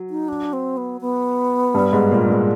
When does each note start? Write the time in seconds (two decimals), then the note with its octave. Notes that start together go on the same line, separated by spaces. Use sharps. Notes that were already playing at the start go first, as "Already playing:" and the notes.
Already playing: F#3
0.10 D#4
0.28 D4
0.53 C4
0.77 B3
1.01 B3
1.75 G2 G3
1.92 G#2 G#3
2.11 A#2 A#3
2.29 G#2 G#3